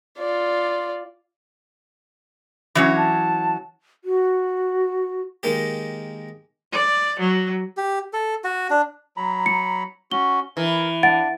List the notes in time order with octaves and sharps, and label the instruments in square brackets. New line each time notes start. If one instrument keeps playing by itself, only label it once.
[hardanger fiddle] F4 D5
[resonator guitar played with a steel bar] E3 F#3 C#4
[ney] A5
F#4
[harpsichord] D#3 G#3 A#3 G4
[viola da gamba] D5
F#3
[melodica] G4
A4
F#4
D4
F#3 A#5 B5
[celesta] C#7
[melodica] C#4 F#4 [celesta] G7
[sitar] E3 [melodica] A#4
[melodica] D4 [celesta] F#5 A6 D7